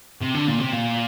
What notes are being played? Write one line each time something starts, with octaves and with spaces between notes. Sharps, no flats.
C3
D3
A#2
C3
A#2